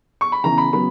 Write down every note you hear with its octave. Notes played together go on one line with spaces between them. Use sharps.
C#6
B5
C#3 E3 B3 A#5
B5
C#3 F#3 B3 B5